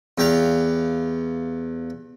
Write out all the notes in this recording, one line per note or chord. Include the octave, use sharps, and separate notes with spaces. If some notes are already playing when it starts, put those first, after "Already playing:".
E2 G4 F5